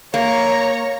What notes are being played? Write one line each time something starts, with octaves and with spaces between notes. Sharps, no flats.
A#3 C#5 A#5